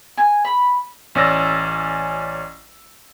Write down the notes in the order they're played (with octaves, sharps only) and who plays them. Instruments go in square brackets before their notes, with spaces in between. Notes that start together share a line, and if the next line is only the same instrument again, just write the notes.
[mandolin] G#5
B5
[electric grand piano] A1 C#4 D5 E6 A#6